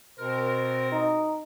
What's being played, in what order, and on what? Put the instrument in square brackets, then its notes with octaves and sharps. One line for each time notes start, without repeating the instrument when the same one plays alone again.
[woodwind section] B2 C4 A#4 [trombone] C5
[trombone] D#4